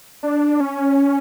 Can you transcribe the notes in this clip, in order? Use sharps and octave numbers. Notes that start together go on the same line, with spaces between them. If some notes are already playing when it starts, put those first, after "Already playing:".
D4
C#4